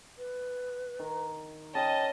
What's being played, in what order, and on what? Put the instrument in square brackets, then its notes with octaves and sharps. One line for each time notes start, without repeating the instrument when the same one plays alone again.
[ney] B4
[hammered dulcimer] D#3
[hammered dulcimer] C#3 [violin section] D#5 [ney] G5 [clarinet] A5